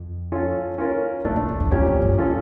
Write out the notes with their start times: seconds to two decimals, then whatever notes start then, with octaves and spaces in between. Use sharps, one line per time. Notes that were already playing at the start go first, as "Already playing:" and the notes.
Already playing: F2
0.32 C#4 F4 A4
0.78 C#4 F4 A#4
1.24 A2 A3 D4 A4
1.36 A#2
1.49 E2
1.60 F2
1.71 E2 A#2 F3 C#4 G4 C#5
1.87 F2
2.02 G2
2.18 F3 C#4 F4 A4 C#5